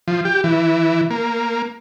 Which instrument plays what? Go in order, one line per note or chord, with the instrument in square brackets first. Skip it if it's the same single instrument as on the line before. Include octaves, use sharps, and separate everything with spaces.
[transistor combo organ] F3
G4
E3
A#3